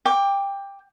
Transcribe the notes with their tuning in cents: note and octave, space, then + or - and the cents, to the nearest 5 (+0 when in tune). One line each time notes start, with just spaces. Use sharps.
G5 +20 D6 +0